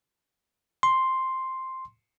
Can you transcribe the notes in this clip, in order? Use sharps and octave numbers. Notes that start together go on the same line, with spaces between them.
C6